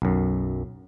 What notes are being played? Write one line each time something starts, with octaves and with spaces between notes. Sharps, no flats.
B1 F#2